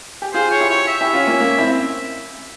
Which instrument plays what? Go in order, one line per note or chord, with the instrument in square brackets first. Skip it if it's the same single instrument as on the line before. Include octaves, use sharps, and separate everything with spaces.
[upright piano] G4
[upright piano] F4 G#4 [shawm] C5
[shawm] C#5
[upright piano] E4 G4
[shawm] C#5
E5
[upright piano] E4 G4
C#4 F4
A#3 C#4
A#3 C#4
C4 E4